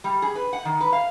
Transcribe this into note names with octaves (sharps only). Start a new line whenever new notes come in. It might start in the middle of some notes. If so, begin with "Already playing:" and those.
G3
G#4
B4
F#5
D#3
B4
F5